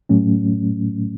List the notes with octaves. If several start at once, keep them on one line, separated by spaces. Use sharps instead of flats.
A2 F#3 A3 C#4